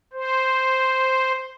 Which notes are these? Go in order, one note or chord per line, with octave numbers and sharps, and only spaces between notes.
C5